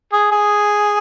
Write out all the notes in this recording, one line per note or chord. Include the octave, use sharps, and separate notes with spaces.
G#4
G#4